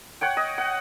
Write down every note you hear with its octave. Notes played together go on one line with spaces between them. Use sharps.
C#5 F#5 G5
D#5
F#5